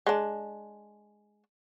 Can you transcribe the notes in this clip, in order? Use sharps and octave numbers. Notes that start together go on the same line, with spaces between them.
G#3 D4